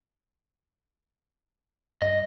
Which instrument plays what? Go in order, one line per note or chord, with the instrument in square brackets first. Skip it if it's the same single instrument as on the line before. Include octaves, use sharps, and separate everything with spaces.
[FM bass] G2 [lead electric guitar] D#5